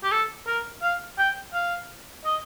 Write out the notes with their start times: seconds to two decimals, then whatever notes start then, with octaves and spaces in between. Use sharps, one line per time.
0.03 G4
0.12 A4
0.47 A#4
0.82 F5
1.18 G5
1.54 F5
2.25 D#5